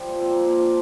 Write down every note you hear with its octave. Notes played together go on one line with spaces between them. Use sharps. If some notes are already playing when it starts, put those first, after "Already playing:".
Already playing: F3 G3
A#2
C4
F3
A#3
A#2
F3 D4